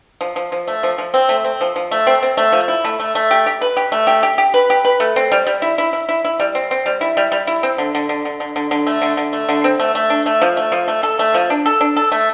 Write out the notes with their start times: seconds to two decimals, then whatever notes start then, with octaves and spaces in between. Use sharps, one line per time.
0.21 F3
0.36 F3
0.52 F3
0.68 A3
0.83 F3
0.98 F3
1.14 C4
1.29 A3
1.44 C4
1.61 F3
1.76 F3
1.91 A3
2.07 C4
2.22 C4
2.37 A3
2.52 F3
2.68 E4
2.85 A3
3.00 A3
3.15 A3
3.31 G4
3.46 G4
3.61 B4
3.77 G4
3.92 A3
4.07 G4
4.23 G4
4.38 G4
4.54 B4
4.70 G4
4.85 B4
5.00 A3
5.16 C4
5.32 G3
5.47 G3
5.62 E4
5.78 E4
5.93 E4
6.09 E4
6.25 E4
6.40 G3
6.55 C4
6.71 C4
6.86 G3
7.01 E4
7.17 G3
7.32 G3
7.47 E4
7.63 C4
7.78 D3
7.95 D3
8.09 D3
8.25 D3
8.40 D3
8.56 D3
8.71 D3
8.87 A3
9.02 D3
9.17 D3
9.33 A3
9.49 D3
9.64 C4
9.80 A3
9.95 A3
10.10 D4
10.26 A3
10.42 F3
10.57 A3
10.72 F3
10.88 A3
11.03 A4
11.19 A3
11.34 F3
11.50 D4
11.66 A4
11.81 D4
11.96 A4
12.12 A3